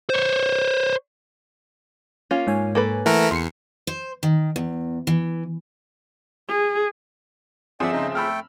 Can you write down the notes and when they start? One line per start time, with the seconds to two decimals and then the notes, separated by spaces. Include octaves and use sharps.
0.10 C5 C#5
2.31 A#3 C#4 F4
2.47 G#2 C#5 G#5
2.75 A#3 A4 B4
3.06 E3 A3 A#4 F#5
3.31 E2 C6 C7 C#7
3.87 C5
4.23 D#3
4.56 E2
5.07 E3
6.49 G#4
7.80 G1 F3 C4 G#4 D5 E5 F#5
7.92 C#3 D#4 D#5
8.15 A3 A4 G5 B5 E6 F6